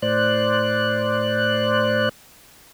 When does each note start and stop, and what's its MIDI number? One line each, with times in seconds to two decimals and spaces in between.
0.02 2.09 45
0.02 2.09 72
0.02 2.09 74
0.02 2.09 90